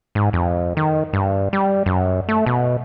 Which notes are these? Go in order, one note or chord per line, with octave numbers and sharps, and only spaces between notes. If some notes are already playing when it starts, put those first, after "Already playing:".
G#2
F2
D#3
G2
G3
F#2
A3
B2